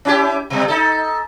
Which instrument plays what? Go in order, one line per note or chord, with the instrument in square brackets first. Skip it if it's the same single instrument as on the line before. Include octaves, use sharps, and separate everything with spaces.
[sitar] C#4 E4 G4
B2 G3
D#4 A4